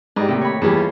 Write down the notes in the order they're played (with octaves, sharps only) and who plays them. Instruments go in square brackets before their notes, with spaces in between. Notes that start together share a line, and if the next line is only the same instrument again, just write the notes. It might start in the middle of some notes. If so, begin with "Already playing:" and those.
[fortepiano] G#2 [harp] G4 D5 D#5
[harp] A2 D#3 A#3 [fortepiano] C3
[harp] C#5 B5
[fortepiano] E2 G3 [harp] G#4 B4
[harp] F4 A4